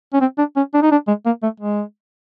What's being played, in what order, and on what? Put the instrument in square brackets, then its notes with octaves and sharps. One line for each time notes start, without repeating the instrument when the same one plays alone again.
[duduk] C#4
C4
D4
C#4
D4
D#4
D4
G#3
A#3
A3
G#3